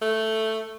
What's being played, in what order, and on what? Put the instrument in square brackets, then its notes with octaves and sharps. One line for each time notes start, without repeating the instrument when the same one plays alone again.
[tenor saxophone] A3